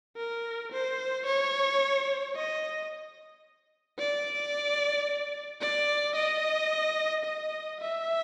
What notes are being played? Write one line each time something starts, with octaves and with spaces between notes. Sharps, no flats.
A#4
C5
C#5
D#5
D5
D5
D#5
D#5
E5